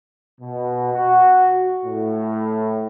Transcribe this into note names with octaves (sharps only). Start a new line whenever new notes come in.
B2
F#4
A2